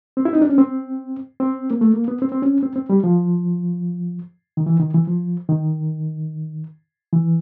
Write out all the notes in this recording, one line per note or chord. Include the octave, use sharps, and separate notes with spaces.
C4
E4
D#4
D4
C#4
C4
C4
A#3
A3
A#3
B3
C4
C4
C#4
C4
C4
G3
F3
D#3
E3
D#3
E3
F3
D#3
E3